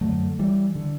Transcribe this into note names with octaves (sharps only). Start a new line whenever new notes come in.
F#2 D3 F#3 A3
E3 G3
D3